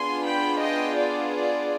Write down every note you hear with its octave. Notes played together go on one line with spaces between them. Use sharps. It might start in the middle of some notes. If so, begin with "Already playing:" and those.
Already playing: B3 D4 F4 G#4 G#5 C6
G5 B5
D#5 G5
D5
D5